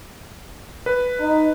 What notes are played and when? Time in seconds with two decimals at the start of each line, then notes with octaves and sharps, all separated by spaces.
0.86 B4
1.20 D#4